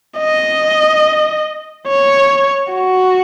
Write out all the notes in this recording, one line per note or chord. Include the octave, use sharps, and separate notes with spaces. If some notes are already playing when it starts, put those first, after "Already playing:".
D#5
C#5
F#4